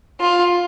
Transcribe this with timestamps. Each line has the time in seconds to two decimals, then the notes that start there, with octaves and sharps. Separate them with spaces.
0.20 F4